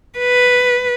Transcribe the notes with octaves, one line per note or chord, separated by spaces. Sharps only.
B4